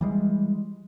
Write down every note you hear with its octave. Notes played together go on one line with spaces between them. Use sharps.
E3 G3 G#3